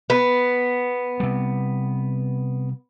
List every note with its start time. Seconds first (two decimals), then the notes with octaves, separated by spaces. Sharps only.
0.10 B3
1.20 C3 G3